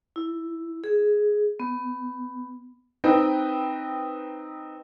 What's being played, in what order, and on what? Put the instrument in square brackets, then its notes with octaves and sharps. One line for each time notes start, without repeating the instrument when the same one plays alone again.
[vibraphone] E4
G#4
B3
[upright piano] C4 D#4 B4 G5